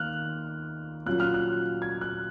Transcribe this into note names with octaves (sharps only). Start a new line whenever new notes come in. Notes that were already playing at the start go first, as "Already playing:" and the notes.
Already playing: D#3 A#3 D#4 F6 F#6
A#2 F#3 C#4 F4 F#6
F6
F#6
G#6
F#6